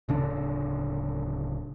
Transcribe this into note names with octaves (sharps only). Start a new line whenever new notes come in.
D1 C#3 D4